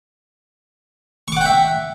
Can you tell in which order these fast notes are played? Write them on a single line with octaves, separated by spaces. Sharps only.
C#6 D6 F#5 G5 E5